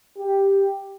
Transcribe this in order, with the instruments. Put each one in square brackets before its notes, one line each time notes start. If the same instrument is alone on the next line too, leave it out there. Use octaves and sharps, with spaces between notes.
[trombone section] G4